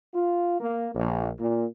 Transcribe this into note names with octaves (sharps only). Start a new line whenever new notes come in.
F4
A#3
A#1
A#2